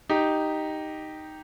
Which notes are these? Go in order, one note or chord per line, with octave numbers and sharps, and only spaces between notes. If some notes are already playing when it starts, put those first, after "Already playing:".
D#4 G4